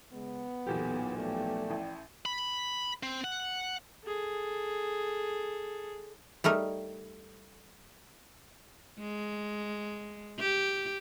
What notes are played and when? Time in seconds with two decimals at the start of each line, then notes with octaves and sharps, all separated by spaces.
0.13 C#3 G#3 B3
0.67 B1 E2 A#2 E3 G4 A4
1.18 F3 A3 D5 G5
1.70 A1 A2
2.26 B5
3.03 C4
3.24 F#5
4.05 G#4 A4
6.44 G3 A3 D#4 A#4
8.99 G#3
10.39 G4